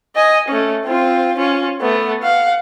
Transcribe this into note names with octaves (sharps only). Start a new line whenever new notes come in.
D#5 G#5
A3 C#4
C4 F4
C#4 F4
A3 B3
F5 F#5